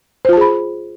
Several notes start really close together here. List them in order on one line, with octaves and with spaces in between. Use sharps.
C5 F4 A5 G#4 B5